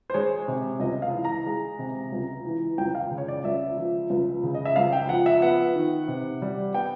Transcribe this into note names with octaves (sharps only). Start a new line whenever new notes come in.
C5
G#3 C#5
C3
C#2 D#5
F5
E3
A#5
G#3
C3
C#2
E3
C#2 G5
F5
C#3
C#5
D5
C#2 E5
F3
C#2
C#3
D#5
E5
C#2 F5
G5
F3 F#5
E5
B3 F#5
D#3
C3
G3
B3 G5